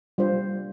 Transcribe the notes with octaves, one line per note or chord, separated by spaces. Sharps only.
G3 D4 F4 C5